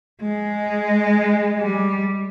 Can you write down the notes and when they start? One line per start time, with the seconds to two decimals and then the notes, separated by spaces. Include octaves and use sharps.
0.22 G#3
1.60 G3